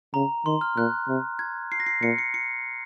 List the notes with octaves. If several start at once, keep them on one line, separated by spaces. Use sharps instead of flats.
C#3 A#5
D#3 C6
F6
A#2 F#6
C3
G#6
C7
A#6
C7
A#2 C#7
C#7
C#7